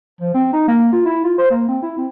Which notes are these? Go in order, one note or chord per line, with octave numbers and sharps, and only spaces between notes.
F3
C4
D#4
A#3
F4
E4
F4
C5
A#3
C4
E4
C4